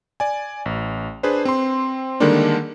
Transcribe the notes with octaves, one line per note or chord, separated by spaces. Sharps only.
D5 G#5
A1
D4 G#4 B4 C5
C4 C6
D3 D#3 G3 G#3 A#3 D4